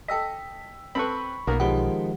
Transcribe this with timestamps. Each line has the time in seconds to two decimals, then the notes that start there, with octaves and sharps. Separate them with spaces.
0.08 A4 D#5 G5 E6 B6
0.95 C4 A4 B4 B5 C#6
1.47 B1 A#3 B3 A#4
1.60 D#3 F3 G#3 B3 G4 F#5